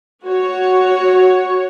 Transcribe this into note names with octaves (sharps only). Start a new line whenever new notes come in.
F#4 C#5